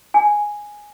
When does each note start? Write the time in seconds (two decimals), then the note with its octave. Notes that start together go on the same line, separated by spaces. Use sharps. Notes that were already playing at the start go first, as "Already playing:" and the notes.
0.14 G#5